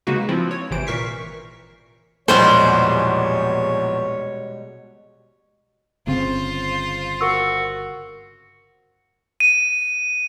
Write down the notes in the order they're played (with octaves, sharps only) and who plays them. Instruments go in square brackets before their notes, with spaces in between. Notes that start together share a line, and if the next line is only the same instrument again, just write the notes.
[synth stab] C#3 G#3 A#3 D#4 F#4 B4
F3 C4 E4 F4
C#5
G#1 C3 E3 C5 D7
A#2 E3 A#4 C#6 B6 C7
[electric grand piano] A#1 E2 [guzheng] B2 G3 G#3 [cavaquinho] C5 [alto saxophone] C#5
[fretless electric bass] G1 C#3 C4 [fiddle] F4 C5
[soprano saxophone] F#4 [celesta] A#4 C#6 E6
[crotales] D#7